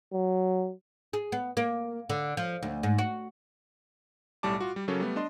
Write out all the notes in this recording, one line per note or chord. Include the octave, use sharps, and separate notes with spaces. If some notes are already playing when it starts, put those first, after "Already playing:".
F#3
G#4
B3
A#3
D3
F3
D2
G#2
F#4
B1 A2 G3 D5 A5 D6
F4 F#4
G3
C#3 F#3 C#4 A4 A#4 C#5
G3 A3 B3
D4 D#5 C6